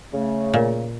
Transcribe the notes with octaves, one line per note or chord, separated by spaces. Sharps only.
C#3 A3
A#2